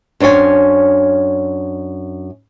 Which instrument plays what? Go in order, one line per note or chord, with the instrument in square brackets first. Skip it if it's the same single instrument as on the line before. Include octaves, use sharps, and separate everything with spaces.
[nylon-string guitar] F#2 D4 C5 C#5 G#5